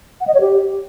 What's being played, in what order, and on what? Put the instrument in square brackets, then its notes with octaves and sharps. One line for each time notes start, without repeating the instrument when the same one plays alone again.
[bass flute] F#5
D#5
C#5
G4